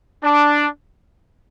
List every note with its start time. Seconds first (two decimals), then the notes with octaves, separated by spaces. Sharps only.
0.23 D4